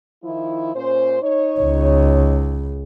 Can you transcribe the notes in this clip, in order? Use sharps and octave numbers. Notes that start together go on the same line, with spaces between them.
D#3 F3 E4
A#2 C#4 C5
D#4 C#5
C#2